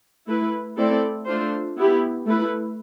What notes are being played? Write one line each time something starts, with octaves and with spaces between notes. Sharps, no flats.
A3 E4 B4
A3 C4 E4 A4 D5
A3 D4 F4 C5
B3 E4 G4
A3 E4 B4